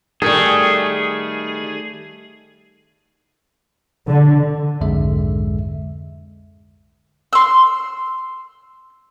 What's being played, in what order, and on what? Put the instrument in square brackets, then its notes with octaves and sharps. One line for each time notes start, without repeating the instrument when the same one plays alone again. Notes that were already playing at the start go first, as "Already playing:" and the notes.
[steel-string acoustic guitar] D#3 G3 [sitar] A3 [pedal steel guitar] G#4
[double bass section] D3
[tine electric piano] B1 F2 G#2 D3 G#3 E5
[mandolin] C6 E6